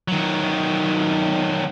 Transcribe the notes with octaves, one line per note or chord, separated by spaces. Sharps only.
D#3 F#3